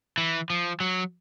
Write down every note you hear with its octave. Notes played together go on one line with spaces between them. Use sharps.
E3
F3
F#3